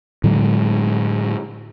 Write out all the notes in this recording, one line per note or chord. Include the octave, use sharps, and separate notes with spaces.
A2 D3 F#3 G#3